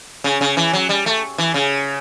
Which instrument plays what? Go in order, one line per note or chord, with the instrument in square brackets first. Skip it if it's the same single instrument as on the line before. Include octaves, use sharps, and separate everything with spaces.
[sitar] C#3
C#3
E3
F#3
G3
A3
E3
C#3